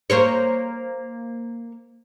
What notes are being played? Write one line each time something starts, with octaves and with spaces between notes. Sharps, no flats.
A#3 C5 C#5